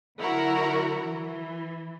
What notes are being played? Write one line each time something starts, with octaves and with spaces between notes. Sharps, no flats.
D3 F#3 E4 F#4 A#4
E3